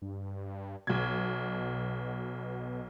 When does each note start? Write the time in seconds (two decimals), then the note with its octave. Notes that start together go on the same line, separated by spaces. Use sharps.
0.02 G2
0.87 B1 B2 G#6